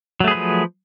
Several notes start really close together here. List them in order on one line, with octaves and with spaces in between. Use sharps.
F#3 A3 G#4 B4 F3